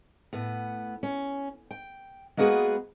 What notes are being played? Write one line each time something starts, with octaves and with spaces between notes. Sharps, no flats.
A2 B3
C#4
G5
G#3 A#3 B3 F#4 G#4 B4